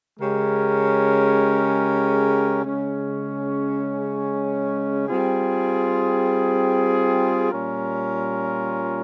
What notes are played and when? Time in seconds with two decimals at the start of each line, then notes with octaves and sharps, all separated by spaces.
0.20 C#3 G#3 C#4 G4 A#4
2.64 C#3 G#3 C#4
5.07 G3 C4 F4 G#4
7.51 A#2 G3 C#4 F4 A#4